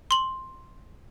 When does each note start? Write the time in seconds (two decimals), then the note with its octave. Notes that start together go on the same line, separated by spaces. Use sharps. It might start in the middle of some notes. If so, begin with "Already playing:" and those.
0.11 C6 F#7